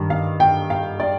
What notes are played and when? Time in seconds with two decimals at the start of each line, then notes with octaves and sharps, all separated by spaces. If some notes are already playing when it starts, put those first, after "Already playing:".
Already playing: G2 D#3
0.10 F5
0.40 G5
0.70 F5
1.00 D5